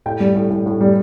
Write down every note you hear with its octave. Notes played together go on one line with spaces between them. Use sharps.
A2 G5
G3
A2
A2
A2
G3